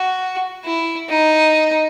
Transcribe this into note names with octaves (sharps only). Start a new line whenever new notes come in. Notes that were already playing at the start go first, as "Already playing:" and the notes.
Already playing: F#4
E4
D#4